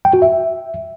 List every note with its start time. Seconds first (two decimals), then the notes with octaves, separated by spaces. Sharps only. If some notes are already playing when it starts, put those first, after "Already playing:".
0.05 G5
0.13 F#4
0.22 E5